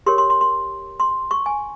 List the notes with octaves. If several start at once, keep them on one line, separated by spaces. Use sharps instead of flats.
G4 A#4 C#5 C6
C6
C6
C6
C6
C#6
G#5